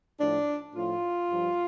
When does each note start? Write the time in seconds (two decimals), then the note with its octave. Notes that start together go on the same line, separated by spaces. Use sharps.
0.20 A2 F3 D4
0.75 A2 F3 F4
1.30 G2 F3